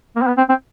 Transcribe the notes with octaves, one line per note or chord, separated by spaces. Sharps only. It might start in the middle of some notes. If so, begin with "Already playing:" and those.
A#3
C4
B3
C4
C4